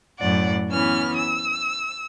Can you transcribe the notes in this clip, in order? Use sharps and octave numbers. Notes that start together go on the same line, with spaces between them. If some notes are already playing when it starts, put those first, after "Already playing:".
F#2 A2 D5 F#5
E3 B3 C#4 F6
E6